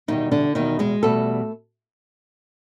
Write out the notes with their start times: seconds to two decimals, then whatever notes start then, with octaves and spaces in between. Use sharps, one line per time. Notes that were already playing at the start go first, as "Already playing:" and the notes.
0.08 E2 B2 D#3 G3 D#4
0.31 D3 D4
0.55 E2 B2 D#3 G3 D#4
0.79 G#3 G#4
1.03 E2 B2 G3 A3 A4